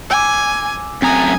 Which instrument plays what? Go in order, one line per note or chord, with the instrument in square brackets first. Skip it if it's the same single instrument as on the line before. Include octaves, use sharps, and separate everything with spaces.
[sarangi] G#5 [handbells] D6 E6
[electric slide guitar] F#2 A3 A#5 [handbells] C4 D#6 [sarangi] G#5